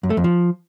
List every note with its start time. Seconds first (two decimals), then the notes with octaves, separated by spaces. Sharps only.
0.03 F#2
0.10 A3
0.17 F2
0.24 F3